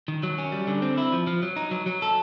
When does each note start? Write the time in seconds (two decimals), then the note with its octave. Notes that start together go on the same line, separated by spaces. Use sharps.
0.08 D#3
0.23 F#3
0.38 C#4
0.52 G3
0.67 D3
0.82 C4
0.98 E4
1.13 F3
1.27 F3
1.43 F#3
1.56 D#4
1.71 F#3
1.86 F#3
2.02 A4